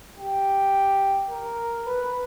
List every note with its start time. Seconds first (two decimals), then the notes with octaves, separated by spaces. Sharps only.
0.18 G4
1.30 A#4
1.86 B4